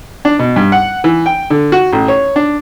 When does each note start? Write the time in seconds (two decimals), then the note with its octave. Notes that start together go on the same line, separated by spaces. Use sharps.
0.25 D4
0.39 B2
0.56 G2
0.72 F#5
1.04 E3
1.26 G5
1.50 D3
1.72 F#4
1.93 A1
2.08 C#5
2.36 D4